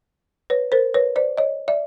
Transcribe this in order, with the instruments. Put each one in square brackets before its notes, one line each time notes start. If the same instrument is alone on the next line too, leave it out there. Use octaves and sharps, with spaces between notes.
[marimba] B4 C#5
A#4 C5
B4 C#5
C5 D5
C#5 D#5
D5 E5